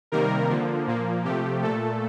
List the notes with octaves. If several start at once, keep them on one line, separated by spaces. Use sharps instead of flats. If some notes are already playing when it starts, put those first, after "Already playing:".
C3 D#3 G3 A#3 A#4
D3 F3 A#3
A#2 F3 A#3
C3 F3 A3 G4
A#2 A3 A4